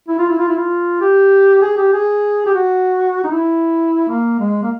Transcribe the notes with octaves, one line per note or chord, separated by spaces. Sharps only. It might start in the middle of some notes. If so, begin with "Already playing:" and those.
E4
F4
E4
F4
E4
F4
G4
G#4
G4
G#4
G4
F#4
D#4
E4
A#3
G#3
A#3